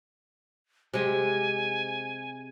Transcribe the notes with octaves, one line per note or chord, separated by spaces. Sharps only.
C3 G#3 G4 G#5